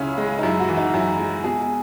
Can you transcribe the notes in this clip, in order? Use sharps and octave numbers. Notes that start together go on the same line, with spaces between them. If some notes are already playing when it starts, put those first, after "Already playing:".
Already playing: C#2 C#3 C#4 E4
G#3
D#4
F#2 E4
F#4
E3
D#4
F#2 E4
G#3
B2 G#4